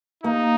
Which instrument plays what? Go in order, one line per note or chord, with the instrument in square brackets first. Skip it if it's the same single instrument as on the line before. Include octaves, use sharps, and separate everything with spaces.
[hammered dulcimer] A#3 [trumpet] D#4